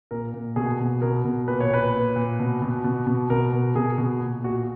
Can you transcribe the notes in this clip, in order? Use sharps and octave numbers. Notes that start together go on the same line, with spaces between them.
A#2 A#4
A#2
B2 G#4
B2
B2 A#4
B2
A#2 B4
C#5
A#2 B4
A#2
A#2
B2
B2
B2
B2
B2 A#4
B2
B2 G#4
B2
A#2
A#2 F#4